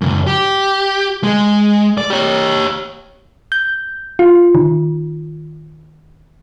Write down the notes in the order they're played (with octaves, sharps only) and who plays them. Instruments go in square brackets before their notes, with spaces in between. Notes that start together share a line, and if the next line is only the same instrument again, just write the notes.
[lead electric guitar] C#2 F#2
G4
G#3
D5
G4 C#5
[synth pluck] G6
F4
D#3